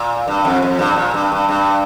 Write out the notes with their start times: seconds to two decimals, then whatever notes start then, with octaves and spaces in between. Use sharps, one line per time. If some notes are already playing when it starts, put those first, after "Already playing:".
Already playing: A#2
0.28 G2
0.45 F2
0.62 F2
0.79 G2
0.96 A#2
1.14 G2
1.32 G2
1.49 G2